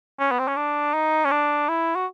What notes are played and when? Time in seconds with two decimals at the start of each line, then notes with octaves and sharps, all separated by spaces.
0.19 C#4
0.31 B3
0.39 C4
0.48 C#4
0.56 D4
0.94 D#4
1.25 C#4
1.31 D4
1.69 E4
1.96 F#4